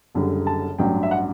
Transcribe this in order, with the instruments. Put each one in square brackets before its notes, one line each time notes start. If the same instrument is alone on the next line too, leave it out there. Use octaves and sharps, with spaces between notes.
[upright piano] F#1 F#2 D3 G3
A5
A1 G2 F#3 G5
E5
F#5